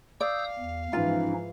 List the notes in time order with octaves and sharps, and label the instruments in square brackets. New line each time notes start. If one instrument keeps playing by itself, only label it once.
[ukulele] D5 [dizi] F5 [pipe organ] D#6 E6 G6
[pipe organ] E2
[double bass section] G#2 E3 F3 [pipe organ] C#4 D#4 [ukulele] F4